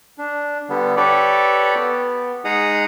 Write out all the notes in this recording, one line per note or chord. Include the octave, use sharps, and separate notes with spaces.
D4
D3 G3 B3
G4 A4 B4 C#5 D5
B3
G#3 D#4 G#4 F#5 A#5 D#6